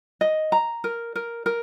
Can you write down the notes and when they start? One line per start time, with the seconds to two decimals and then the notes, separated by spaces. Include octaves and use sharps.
0.21 D#5
0.52 A#5
0.84 A#4
1.15 A#4
1.46 A#4